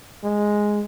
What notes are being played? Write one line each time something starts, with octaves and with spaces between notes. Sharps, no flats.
G#3